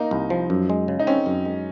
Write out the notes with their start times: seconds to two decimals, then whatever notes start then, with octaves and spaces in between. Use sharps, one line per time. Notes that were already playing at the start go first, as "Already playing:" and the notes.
Already playing: A#3 D#4
0.11 C2
0.30 F3
0.50 F#2
0.70 G#3
0.88 C#3
0.99 D#4
1.07 C4 C#4
1.26 F#2
1.45 G#3